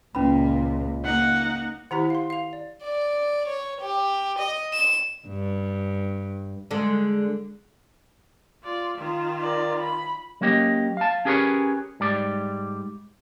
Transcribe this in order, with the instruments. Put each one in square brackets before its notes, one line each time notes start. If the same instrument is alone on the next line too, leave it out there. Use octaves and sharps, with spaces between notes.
[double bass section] C#2 [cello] A#2 [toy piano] C#4 B4 B5
[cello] A#3 D#4 [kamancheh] F#5
[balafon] D#3 E4 G4 [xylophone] F#5 A#5 B6
[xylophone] F5 C6
F5 F7
D5
[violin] D5
C#5
G4
D#5
E7
[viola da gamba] G2
[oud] D3 G#3 A4
[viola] F4 D5
D#3 F4
[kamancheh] A#4 D5
B5
[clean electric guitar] F#3 A#3 C#4 G4 D#5
F5 A5
C#4 G4 G#4 A#4 B4 C#5
G#2 G3 D5